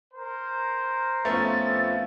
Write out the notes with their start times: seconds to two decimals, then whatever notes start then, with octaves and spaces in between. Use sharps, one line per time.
0.14 A#4 C5
1.25 F2 F3 A3 B3 C#4 E4 A6